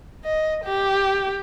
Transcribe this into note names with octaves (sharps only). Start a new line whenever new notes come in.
D#5
G4